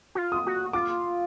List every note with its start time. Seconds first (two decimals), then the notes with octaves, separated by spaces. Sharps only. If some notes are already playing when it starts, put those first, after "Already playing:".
0.15 F#4
0.18 F4
0.32 D#6
0.47 F#4
0.73 F4 D6